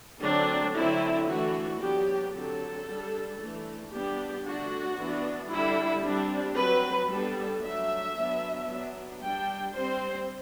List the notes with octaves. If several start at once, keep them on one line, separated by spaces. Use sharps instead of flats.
D3 F#3 A3 C4 D4
D3 F#3 C4 E4
E3 A3 D4 F#4
F#3 B3 D4 G4
D3 F#3 C4 A4
G3 D4
E3 A3 D4
G3 B3 D4 G4
D3 A3 D4 F#4
E3 B3 D4
D3 G3 D4 E4
G3 C4 D4
F#3 C4 B4
G3 B3 D4 A4
F#3 A3 D4 E5
F#3 B3 D4
F#3 B3 D4
G3 D4 G5
G3 C4 C5